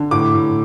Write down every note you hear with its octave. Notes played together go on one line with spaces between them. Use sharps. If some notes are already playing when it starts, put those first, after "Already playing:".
Already playing: D3
A2 D6
A2